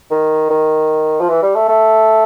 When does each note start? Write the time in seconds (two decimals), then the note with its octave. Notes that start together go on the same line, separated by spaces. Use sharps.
0.11 D#3
0.50 D#3
1.21 F3
1.29 E3
1.43 G3
1.55 A3
1.69 A3